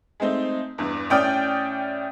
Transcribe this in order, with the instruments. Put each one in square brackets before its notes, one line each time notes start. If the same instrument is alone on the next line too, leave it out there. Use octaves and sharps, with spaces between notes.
[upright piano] G#3 A3 C4 D#4
E2 G2
A2 C#4 D5 G5 D#6 F6